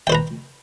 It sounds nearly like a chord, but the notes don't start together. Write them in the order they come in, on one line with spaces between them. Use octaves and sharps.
G5 C5 B4 A#5